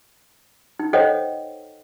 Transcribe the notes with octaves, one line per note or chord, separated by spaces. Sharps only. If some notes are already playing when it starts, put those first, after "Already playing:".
D#4
A4 C5 C#5 D#5 F#5 G5